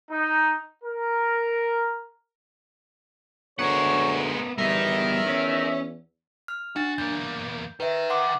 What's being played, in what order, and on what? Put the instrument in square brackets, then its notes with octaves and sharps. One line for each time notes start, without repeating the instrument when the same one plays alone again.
[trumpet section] D#4
A#4
[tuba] D2 [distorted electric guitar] G#3 F#5 [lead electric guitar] B3 A#4 [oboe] C#5
[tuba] E2 [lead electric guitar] G3 B3 [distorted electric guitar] A#4 D#5 [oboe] E5
[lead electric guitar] C#4
[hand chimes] F6
[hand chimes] D4 A6 [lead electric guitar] F#4
[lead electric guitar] E2 A#3 [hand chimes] G6
[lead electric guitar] D#3 [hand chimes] B4 E5
[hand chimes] F#5 C6 D6